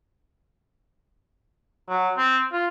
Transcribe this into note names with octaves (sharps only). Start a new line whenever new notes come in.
F#3
C4
F4